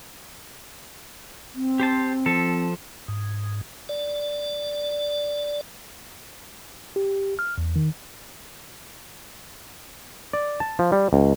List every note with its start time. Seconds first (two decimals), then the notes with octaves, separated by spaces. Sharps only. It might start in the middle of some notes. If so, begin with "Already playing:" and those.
1.55 C4
1.80 G4 C5 A5
2.26 F3 A4
3.08 G#2
3.89 D5
6.96 G4
7.39 F6
7.58 E2
7.76 D#3
10.33 D5
10.60 A5
10.79 F3
10.92 G3
11.13 C#2